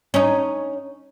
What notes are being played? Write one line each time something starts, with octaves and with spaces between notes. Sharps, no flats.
C#4 D#4